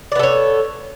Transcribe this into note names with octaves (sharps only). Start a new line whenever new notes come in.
B3 A4 C#5 D5